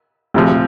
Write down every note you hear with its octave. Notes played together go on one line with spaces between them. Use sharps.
D2 C3 F3